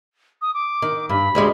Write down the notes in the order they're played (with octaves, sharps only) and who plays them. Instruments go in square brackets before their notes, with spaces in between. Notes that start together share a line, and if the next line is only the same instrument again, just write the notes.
[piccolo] D#6
D6
[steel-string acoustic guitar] D#3
[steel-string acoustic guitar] G2 [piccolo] B5
[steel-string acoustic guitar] D2 G3 G#3